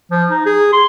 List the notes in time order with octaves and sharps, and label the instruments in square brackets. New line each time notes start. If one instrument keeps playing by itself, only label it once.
[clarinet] F3
D#4
G#4
C6